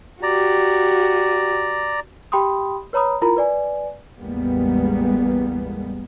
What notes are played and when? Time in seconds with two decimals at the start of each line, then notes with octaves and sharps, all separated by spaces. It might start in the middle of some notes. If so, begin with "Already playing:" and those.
0.23 F#4 G4 D5 A#5
2.32 G4 G5 B5 C6 D#6
2.93 B4 C#5 A#5 B5 D#6
3.22 E4 F4 A#4 A#5 B5
3.37 B4 D5 G#5
4.19 A1 E2 G3 G#3 A#3 B3